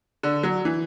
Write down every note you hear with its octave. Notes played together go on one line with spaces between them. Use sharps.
D3
F#3
E3